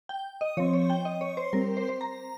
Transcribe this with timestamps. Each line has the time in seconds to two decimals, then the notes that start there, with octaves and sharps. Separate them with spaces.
0.09 G5
0.41 D#5
0.57 F3 C4 C#5
0.73 C#5
0.90 G5
1.05 D#5
1.21 C#5
1.37 C5
1.53 G3 C4 A#4
1.77 C5
1.89 C5
2.01 A#5